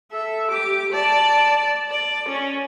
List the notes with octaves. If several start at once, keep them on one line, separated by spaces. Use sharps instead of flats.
A4 E5
G4 D6
D5 A5
D5
C#4